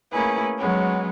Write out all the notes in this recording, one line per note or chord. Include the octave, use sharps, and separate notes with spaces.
A3 A#3 C#4 E4 G#4 B4
F#3 G#3 B3 C#4